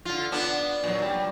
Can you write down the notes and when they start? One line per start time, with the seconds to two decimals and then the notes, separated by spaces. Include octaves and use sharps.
0.05 D3 F4
0.32 B3 D4
0.84 A#2 F#3
1.02 G3